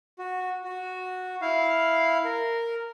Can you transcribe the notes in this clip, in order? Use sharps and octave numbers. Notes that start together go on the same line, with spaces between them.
F#4
F#4
E4 F5
A#4